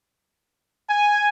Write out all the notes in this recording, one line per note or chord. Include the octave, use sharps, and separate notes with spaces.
G#5